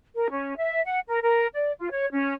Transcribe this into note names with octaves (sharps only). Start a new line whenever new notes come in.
A#4
C#4
E5
F#5
A#4
A#4
D5
F4
C#5
C#4